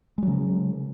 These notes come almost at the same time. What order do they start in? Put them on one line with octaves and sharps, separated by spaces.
G#3 F#3 C#3